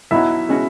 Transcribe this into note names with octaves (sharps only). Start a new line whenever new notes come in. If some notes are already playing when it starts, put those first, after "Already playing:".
B1 B2 F#3 E4 E5
B2 G#3 C#4 F#4